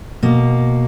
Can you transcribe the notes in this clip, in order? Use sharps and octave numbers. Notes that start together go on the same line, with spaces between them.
B2 A#3